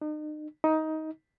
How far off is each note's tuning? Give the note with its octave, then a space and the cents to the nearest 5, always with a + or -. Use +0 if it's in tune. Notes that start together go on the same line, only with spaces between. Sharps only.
D#4 -40
D#4 +15